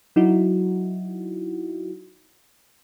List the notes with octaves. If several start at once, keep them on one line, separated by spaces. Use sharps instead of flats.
F#3 D#4 E4 F#4